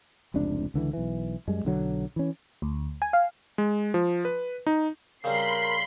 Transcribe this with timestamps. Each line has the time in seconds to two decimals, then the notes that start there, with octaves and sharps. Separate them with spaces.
0.34 F1 C#2 C3 D4
0.74 C#2 D3 E3
0.93 B1 E3
1.48 F#2 G3 G#3
1.65 B1 D3 F#3
2.16 E3 C#4
2.62 D2
3.02 G#5
3.13 F5
3.58 G#3
3.94 F3
4.25 B4
4.67 D#4
5.24 C#3 G3 C4 A#4 B5 C6 C7